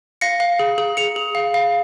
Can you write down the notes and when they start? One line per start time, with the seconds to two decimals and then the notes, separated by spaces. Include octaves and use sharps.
0.21 F5 A#6 C#7
0.40 F5
0.59 G#4
0.78 G#4
0.97 G#4 C#7 F7
1.16 G#4
1.35 F5
1.54 F5